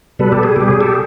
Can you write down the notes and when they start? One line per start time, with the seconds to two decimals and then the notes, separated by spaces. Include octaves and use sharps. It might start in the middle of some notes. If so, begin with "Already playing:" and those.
0.19 B2 G3 A4 B4
0.32 G4 A4
0.43 G#4
0.56 B2 G3 G4
0.68 G#4
0.81 G4 A4